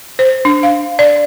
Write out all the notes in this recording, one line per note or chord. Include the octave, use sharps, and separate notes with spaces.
C5
D4
F5
D5